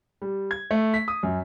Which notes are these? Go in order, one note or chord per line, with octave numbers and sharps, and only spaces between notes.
G3
G#6
A3
B6
D#6
F#2